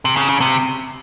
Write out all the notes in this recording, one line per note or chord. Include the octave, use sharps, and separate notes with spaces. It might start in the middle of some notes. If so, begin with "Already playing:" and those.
C3
C#3
C#3
C3